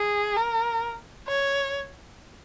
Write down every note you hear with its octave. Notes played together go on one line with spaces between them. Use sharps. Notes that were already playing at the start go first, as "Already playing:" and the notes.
Already playing: G#4
A#4
C#5